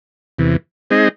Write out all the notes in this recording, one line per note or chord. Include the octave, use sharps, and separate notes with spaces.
E2 C3 E3
G#3 C4 D#4 G#4 D#5